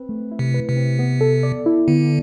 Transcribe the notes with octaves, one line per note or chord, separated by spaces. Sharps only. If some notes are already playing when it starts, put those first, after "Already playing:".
Already playing: C4 B4
A3
E4
C3
B4
C3
C4
B3
A4
D5
E4
D3 B3